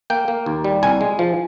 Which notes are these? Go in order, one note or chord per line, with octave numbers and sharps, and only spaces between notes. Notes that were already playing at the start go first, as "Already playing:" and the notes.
A#3 G5
A#3
D#2
G3
C2 G#5
G#3
F3